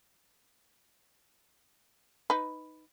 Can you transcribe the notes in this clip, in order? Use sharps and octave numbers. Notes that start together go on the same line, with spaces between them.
D#4 B4